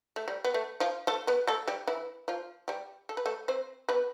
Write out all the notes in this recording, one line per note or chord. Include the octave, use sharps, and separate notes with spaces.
A3
G3
B3
A3
F3 F4
A3 A4
B3 B4
A3 A4
G3 G4
E3 E4
F3 F4
G3 G4
A4
B4
A3 A4
C4 C5
B3 B4